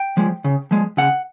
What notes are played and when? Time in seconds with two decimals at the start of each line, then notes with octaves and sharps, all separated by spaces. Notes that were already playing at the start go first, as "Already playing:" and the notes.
Already playing: G5
0.17 F3 G#3
0.44 C#3
0.71 F3 G#3
0.97 C#3 F#5